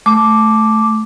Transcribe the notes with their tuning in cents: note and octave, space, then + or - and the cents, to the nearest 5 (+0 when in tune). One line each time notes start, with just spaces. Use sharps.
A3 -10 D6 +0